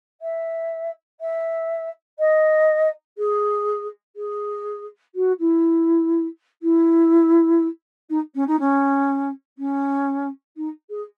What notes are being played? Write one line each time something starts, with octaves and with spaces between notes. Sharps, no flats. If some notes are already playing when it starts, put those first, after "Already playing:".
E5
E5
D#5
G#4
G#4
F#4
E4
E4
D#4
C#4
D#4
C#4
C#4
D#4
G#4